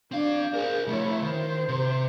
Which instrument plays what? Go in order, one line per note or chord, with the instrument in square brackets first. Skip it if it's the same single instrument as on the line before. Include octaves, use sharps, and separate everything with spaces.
[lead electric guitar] C4 F5 [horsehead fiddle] D4 D5
[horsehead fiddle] G#4 [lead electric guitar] A#4 C5
[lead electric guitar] F3 A3 [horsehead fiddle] E4 C#5
[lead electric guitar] D#3 [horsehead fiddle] C5
[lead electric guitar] C3